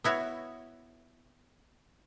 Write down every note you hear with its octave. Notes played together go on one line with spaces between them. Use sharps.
B3 E4 F#4 C#5